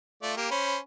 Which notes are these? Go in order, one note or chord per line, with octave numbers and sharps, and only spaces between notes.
A3 F4 D5
A#3 G4
C#4 C5 B5